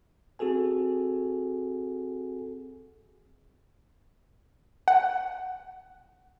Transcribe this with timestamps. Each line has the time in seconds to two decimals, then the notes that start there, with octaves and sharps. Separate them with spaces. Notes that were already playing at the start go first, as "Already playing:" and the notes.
0.39 C4 F#4 G#4 A4 G#5
4.88 F#5